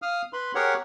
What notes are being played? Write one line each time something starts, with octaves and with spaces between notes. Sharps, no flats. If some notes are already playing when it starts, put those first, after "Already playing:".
F5 D#6 F6
B4 B5 C6
G4 G#4 A#4 C#5 F#5